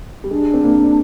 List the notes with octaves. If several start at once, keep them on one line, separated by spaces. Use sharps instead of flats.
G3
G#3 D4
C4
A#3